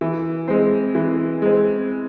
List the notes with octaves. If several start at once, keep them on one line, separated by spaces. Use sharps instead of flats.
E3
G#3 C4
E3
G#3 C4